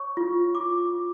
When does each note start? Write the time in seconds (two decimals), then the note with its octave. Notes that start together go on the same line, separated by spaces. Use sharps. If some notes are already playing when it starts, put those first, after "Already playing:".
Already playing: C#5 C#6
0.17 F4
0.55 F4 D6
0.93 F4